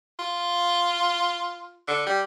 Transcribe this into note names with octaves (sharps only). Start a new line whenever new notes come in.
F4
D3
G3